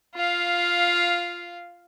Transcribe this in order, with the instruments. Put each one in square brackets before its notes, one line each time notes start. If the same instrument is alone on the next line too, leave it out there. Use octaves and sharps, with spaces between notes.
[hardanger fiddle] F4 F5